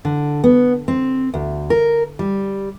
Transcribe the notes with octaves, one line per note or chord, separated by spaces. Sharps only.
D3
B3
C4
D2
A#4
G3